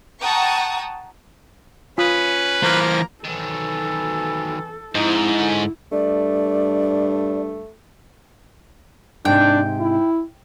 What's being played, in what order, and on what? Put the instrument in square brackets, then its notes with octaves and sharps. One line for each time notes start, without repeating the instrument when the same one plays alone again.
[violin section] F#5 G5 A5 A#5 C#6 D#6
[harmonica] C#4 [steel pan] F4 D#6 [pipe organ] B4
[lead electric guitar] E3 C5 [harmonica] A#3 A#4 A#5
[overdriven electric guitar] D#3 F#3 [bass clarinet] E3 [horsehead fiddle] A4
[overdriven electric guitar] F2 F3 [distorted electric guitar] G#2 [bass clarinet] D#4 [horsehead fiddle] E4
[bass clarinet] D3 [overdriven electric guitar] C#4
[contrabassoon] G2 [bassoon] A3 [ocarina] D5
[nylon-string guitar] G#2 C3 [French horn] D4 [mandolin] G5
[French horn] E4